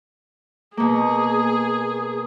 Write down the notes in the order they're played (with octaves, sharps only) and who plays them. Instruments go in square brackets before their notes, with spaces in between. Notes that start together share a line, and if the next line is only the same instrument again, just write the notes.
[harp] B2 A#3 [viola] G#4